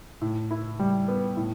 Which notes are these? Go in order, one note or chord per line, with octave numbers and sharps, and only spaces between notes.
A2
E4
G3
B3
A2